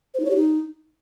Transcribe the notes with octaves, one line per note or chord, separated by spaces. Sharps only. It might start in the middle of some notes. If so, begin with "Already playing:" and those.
C5
D#4
C#5
G4
D#4